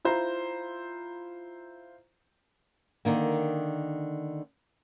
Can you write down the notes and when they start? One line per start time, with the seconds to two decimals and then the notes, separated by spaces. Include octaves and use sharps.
0.05 E4 F4 C5 A#5
3.05 D3 D#3 A#3